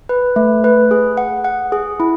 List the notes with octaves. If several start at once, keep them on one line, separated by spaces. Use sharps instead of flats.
B4
A3
B4
G#4
F#5
F#5
G#4
E4